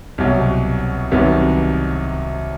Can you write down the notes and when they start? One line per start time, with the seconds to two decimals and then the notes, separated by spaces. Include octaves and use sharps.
0.18 C2 B2 F#3
1.12 C2 C3 D#3 F#3 B3